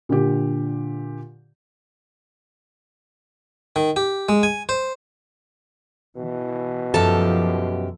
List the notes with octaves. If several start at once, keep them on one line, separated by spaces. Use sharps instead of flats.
A#2 D3 G4
D#3
G4
G#3
G#5
C5
B2 E3
F#2 F3 G4 A4 A5